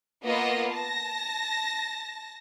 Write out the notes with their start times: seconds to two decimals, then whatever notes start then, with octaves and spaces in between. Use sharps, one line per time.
0.23 A#3 B3 F4 D#5
0.70 A5 A#6